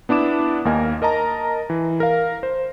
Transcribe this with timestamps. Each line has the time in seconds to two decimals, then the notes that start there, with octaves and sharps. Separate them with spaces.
0.09 B3 D4 E4 D6 E7
0.65 D#2 A#3 A#4 D#5 G#5
1.02 A#4 D#5 A5 A#5
1.70 E3
2.00 A#4 F5
2.43 C5